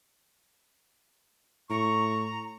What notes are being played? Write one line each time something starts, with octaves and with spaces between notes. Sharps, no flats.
A2 A#5 C#6